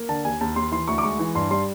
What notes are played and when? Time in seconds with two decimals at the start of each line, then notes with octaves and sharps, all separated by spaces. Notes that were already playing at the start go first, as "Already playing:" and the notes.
Already playing: A#3
0.09 D3 A5
0.25 D#2 G#5
0.41 D#2 A5
0.56 D#2 C6
0.72 E3 C6
0.88 D2 C#6
0.98 D6
1.03 G#3 C#6
1.19 E3
1.35 G2 C6
1.51 G3 C6